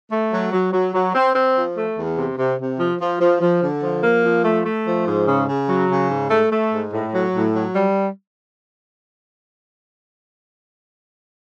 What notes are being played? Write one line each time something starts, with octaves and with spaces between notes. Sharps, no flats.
A3
F#3
F#3
F#3
F#3
C4
C4
F3
A3
E2
C3
C3
C3
F3
F3
F3
F3
D3
F3
A#3
F3
A3
A3
F3
G#2
C#3
C#3
F#3
C#3
G#2
A3
A3
G#2
A2
F#3
A2
F#3
G3